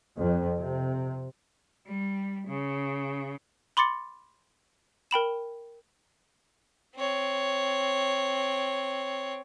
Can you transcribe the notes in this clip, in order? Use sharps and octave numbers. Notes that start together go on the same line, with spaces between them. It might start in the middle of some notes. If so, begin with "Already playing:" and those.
F2
C3
G3
C#3
B5 C6 D6 A6 C#7
A#4 G5 B5 E7
C4 C#5